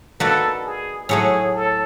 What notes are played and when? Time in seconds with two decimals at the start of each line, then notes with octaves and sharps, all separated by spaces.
0.20 A#3 D#4 F#4 A4 B4 D5
0.65 G#4
1.09 A2 F#3 A3 G#4
1.54 A4